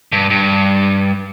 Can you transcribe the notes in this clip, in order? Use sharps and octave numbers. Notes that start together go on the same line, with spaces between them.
G2
G2